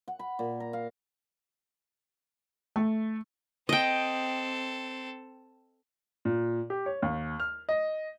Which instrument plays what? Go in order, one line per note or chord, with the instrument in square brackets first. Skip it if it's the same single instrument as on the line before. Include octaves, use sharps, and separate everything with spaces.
[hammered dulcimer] F#5
B5
A#2
A#5
F5
[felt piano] A3
[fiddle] C4 A4 [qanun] D#5 G5
[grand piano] A#2
G4
C#5
D#2
F6
D#5